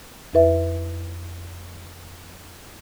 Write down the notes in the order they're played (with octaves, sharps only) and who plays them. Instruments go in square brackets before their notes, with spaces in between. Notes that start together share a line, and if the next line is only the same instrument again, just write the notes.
[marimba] F2 E4 B4 E5